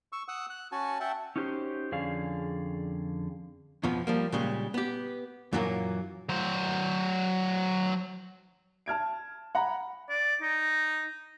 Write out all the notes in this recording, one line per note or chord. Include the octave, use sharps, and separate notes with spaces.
C#6 E6
F#5 D#6 E6 F#6
F#6
C#4 F#4 G#5 A5
E5 F#5 G5 A5
C#4 D#4 F#4 G4 C5
F2 D3 C#4 G#4 D5 F5
F2 B2 F3 B3
F3 G3 A#3
A#2 C#3 G3 G#3
B3 G4
F#2 A#2 E3 F#3 A3 A#3
F#3 C5
A5 F6 G#6 D7
F#5 A#5 B5
D5
D#4